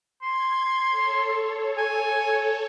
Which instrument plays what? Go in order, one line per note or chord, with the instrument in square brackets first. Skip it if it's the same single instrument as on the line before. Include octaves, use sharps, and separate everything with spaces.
[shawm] C6 [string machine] G#6
[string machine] A4 C#5
[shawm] G#5